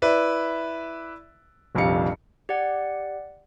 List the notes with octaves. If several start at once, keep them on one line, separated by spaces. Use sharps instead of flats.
E4 B4 D5 E5
F1 A#1 F2 G3 F5 C#7
G4 D5 F#5